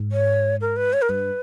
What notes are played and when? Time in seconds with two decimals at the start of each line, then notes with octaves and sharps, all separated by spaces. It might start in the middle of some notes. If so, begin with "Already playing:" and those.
Already playing: G#2
0.12 C#5
0.61 A#4
0.76 B4
0.93 C#5
1.02 A#4
1.09 G2 B4